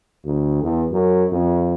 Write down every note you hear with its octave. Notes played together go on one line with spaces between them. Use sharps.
D2
E2
F#2
F2